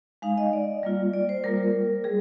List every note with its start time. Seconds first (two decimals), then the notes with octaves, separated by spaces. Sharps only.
0.22 G#3 D#4 F5
0.38 D#5
0.53 D5
0.83 G3 A#3 F4
1.13 D5
1.29 C5
1.44 G3 A#3 F4 A#4
2.04 G3 G#4